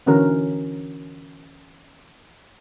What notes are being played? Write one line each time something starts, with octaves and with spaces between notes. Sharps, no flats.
D3 E3 C#4 F#4 A#4